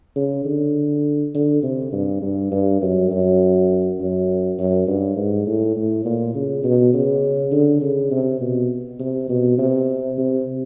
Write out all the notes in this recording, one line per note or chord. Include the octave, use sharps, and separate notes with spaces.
C#3
D3
D3
C3
G2
G2
G2
F#2
F#2
F#2
F#2
G2
G#2
A2
A2
A#2
C#3
B2
C#3
D3
C#3
C3
B2
C3
B2
C3
C3